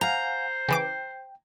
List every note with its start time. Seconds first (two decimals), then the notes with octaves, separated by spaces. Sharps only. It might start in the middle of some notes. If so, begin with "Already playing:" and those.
0.01 C5 F5 F#5 G#5 A#5
0.69 C#3 E3 G5 D6